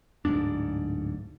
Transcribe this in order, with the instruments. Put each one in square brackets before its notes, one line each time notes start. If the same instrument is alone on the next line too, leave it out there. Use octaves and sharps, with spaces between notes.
[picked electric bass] D1 G#1 G#2 D4